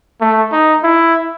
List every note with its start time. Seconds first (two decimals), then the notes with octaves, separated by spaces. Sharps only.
0.21 A3
0.52 D#4
0.83 E4